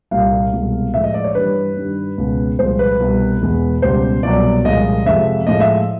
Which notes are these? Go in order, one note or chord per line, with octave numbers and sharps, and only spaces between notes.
C2 A#2 G3 F5
C2 B2 G#3
A2 F3 G#3 E5
D#5
D5
C#5
G2 E3 G3 B4
G2 D#3 G3
C#2 B2 G#3
C2 A#2 F3 G#3 C5
B4
C2 B2 G3
E2 B2 G#3
C#2 B2 G3 C5
C2 B2 F#3 D5
C2 A#2 F3 G#3 D#5
F2 C3 F3 G#3 E5
A2 F3 G#3 D#5
E5